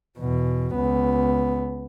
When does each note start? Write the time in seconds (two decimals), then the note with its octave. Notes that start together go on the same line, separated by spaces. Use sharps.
0.19 E2 B2
0.75 C#2 B3